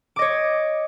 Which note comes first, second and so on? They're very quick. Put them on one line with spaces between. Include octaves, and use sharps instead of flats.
D6 D#5 C#5